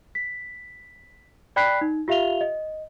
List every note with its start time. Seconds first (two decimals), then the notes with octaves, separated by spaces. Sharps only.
0.15 B6
1.56 D5 G5 B5 F#6 B6 C7
1.81 D#4
2.08 F4 G4 E5 F5 F7 G7
2.41 D#5